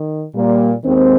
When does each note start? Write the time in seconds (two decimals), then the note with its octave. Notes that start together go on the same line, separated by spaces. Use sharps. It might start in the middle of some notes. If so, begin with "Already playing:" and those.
Already playing: D#3
0.35 A#2 G3 A#3
0.83 D#2 D#3 G#3 C4